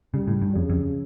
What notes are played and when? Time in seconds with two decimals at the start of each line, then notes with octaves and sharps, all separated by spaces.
0.14 C#3 G3
0.28 A2
0.42 G2
0.55 F2 C#3
0.69 F2